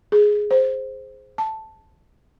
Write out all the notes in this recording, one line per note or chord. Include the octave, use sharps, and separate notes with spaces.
G#4
C5
A5